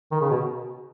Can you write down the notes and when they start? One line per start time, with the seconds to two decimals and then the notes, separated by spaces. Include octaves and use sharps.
0.11 D#3
0.21 C#3
0.30 B2